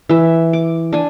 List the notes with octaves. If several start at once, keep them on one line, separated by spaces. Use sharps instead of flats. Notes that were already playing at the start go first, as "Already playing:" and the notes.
E3 E5
D6
D4 G#5